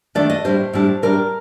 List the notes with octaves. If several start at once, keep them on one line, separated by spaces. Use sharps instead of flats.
D#3 A3 D4 D5
D#5
A2 G3 D4 C5
A2 G3 D4
A2 G3 D4 A#4